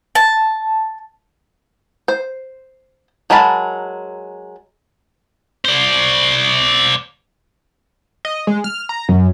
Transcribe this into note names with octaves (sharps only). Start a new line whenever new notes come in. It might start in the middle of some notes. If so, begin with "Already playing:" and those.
A5
C5
F#3 G#3 A#4 A5 B5
C5 D5
D#5
G#3
F6
A#5
F#2